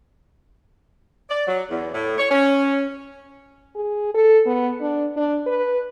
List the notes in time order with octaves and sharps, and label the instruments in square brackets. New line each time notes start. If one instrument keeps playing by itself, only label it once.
[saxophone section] D5
F#3
E2
A2
C#5
C#4
[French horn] G#4
A4
B3
D4
D4
B4